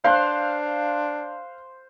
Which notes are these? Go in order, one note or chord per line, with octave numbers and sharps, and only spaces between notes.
D4 C5 F5 C6 F#6